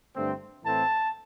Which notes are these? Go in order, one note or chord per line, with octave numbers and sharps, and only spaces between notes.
G2 D3 A3 C4
A2 E3 A3 C4 A5